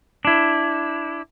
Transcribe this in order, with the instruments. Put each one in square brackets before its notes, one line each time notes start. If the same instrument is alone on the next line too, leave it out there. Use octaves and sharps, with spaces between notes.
[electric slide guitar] D4 E4